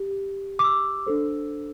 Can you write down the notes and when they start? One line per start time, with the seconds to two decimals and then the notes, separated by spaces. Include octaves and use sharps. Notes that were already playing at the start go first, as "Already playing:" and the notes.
Already playing: G4
0.59 D6
0.64 E6
1.06 D4 A4 C5